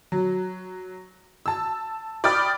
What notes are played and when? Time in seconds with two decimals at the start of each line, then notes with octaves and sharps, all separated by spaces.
0.12 F#3
1.46 A5 E6
2.24 D5 G5 B5 D#6 F6 A6